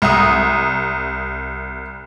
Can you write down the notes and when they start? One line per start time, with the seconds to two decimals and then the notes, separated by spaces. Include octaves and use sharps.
0.02 C2 D#6